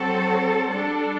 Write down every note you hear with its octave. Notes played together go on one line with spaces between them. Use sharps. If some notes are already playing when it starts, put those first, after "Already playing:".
Already playing: F#3 C4 F#4 A4
G3 D4 A4